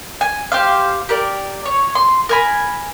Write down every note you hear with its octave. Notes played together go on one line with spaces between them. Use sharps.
G#5
G4 C5 F5
G4 A#4 D5
C#5
C6
A#4 G#5 B5